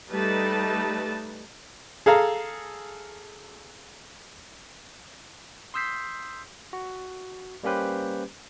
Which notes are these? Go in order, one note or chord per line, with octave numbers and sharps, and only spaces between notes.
G3 A3 D#4 B4 A5
G#4 A4 F5 A#5
C6 D#6 E6 G6 B6 C7
F#4
G3 A#3 C#4 G4 B4 C5